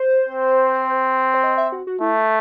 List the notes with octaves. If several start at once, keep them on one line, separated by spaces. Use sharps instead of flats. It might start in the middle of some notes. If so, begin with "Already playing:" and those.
Already playing: C5
C4
C5
D#5
E5
F#4
F#4
A3 E4